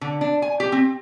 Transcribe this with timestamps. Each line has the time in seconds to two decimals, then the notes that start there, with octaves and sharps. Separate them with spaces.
0.01 D3
0.21 D4
0.42 G#5
0.60 G4
0.72 C4